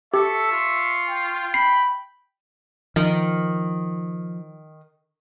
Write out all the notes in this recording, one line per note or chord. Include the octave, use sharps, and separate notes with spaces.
G4 A4 E5 C#6
F4
G5
B5 C7
D#3 F3